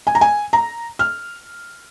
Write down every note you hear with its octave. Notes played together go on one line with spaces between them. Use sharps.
G#5
A#5
G#5
A#5
F6